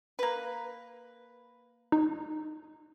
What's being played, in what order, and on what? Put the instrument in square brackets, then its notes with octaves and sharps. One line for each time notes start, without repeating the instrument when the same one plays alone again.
[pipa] A#3 B4
[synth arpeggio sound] D#4